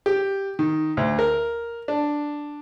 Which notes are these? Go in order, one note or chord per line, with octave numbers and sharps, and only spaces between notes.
G4
D#3
D2
A#4
D4